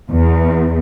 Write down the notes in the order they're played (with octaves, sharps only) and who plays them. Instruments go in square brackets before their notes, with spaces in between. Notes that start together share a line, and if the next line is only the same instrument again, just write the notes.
[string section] E2